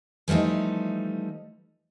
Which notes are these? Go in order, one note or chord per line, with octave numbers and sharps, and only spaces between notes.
E3 F3 G3 A3 D#4